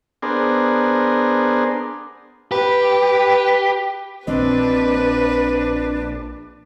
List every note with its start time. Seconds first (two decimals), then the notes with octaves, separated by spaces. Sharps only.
0.22 B3 D4 G#4 A#4 C5
2.52 G4 B4
4.27 A#1 C4 D4 B4 D#5